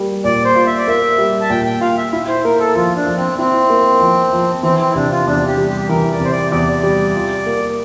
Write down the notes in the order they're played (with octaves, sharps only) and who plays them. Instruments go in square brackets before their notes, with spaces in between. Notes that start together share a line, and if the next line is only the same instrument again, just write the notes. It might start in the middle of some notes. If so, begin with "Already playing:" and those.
Already playing: [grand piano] G3 A#3
[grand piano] A#2 [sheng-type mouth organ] D5
[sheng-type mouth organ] C5
[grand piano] F4
[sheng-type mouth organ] E5
D5
[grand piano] A#3 [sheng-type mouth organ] E5
[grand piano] G3
[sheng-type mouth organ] A5
[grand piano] A#2 [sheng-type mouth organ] G5
[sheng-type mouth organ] G5
[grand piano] F4 [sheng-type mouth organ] F5
[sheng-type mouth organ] E5
[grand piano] E4
[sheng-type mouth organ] C5
[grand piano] A#3 [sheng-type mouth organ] A#4
[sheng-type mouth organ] A4
[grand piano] F3 [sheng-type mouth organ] F4
[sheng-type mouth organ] D4
[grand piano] F3
[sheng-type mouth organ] C4
[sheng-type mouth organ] C4 [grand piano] E4
[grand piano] A#3
F3
F3
[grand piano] E3 [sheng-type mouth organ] C4
[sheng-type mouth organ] C4
E4
[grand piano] C3 [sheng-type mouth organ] D4
[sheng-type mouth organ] F4
[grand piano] E2 [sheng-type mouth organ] D4
[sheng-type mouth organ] G4
[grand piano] G3
[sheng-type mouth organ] G4
[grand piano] E3 [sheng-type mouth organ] A#4
[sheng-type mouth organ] D5
[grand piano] C3 [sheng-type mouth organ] C5
[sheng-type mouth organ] D5
[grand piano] E2 [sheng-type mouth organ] D5
[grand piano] G3
F4
A#3